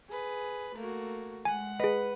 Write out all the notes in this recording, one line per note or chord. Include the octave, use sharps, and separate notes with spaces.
G#4 B4
A3 A#3 F#4
G#3 F#5 G#5
G#4 B4 D#5